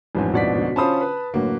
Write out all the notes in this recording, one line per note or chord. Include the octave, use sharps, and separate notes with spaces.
A1 F2 G#2 G3 B4 G#5
E2 B2 D4 D5 F#5 B6
D3 F#3 F#4
C#4 F4 C5 A5 B5 D#6
B4
F#2 A2 D3 A#3 F#4